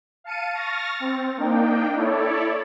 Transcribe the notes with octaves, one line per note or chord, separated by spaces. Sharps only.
F5 A5 C#7 D#7
C#6 F6 A6 A#6
C4
A#3 D4 D#4 G5
E4 A4 C#5 D5